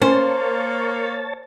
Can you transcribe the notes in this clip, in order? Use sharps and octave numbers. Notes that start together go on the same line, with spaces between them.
A#3 C#4 C5 C#5 A5